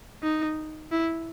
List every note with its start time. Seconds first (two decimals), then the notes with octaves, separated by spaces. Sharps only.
0.23 D#4
0.92 E4